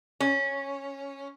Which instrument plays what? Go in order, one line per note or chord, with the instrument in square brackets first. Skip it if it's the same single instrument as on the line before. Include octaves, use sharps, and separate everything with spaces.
[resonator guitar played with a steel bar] C#4